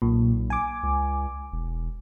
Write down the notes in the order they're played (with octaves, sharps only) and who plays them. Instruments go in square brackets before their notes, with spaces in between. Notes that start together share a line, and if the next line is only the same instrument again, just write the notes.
[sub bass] B1 [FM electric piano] A#2
[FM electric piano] G#5 D6
[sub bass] C#2
E1